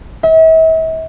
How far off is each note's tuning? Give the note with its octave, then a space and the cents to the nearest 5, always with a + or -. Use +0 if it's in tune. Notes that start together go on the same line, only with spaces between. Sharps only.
E5 -40